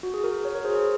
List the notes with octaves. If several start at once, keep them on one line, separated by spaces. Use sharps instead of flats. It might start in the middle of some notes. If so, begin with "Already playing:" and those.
F#4
G#4
F#4 A#4
A#4 C#5
A#4 C#5
G#4 C5
G#4 C5